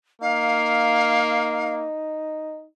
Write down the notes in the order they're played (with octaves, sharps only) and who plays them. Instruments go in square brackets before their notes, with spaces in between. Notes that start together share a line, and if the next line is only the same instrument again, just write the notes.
[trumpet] A#3 [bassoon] D#4 [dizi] F5